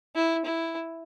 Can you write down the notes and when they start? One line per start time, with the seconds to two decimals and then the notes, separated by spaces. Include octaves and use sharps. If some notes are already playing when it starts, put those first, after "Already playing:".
0.15 E4
0.45 E4